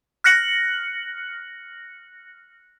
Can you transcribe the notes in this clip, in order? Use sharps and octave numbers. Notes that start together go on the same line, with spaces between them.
F6 F#6 A#6 C#7 F#7